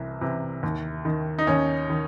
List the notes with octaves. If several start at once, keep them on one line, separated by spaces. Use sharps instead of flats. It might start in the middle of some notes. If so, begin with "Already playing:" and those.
Already playing: C2 C3 E3
C3 E3
D#2
D#3
D#4
D#2 C#4
D#3